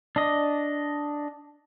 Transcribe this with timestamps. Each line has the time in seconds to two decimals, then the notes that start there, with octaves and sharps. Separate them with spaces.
0.16 D4 D#5